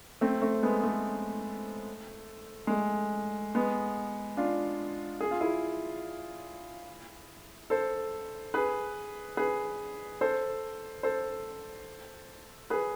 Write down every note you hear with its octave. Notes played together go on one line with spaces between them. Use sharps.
A3 C4
A3 C4
G#3 B3
A3
G#3
A3
G#3 B3
D4 F4
G#4
F4
E4 G#4
A4 C5
G#4 B4
G#4 B4
A4 C5
A4 C5
G#4 B4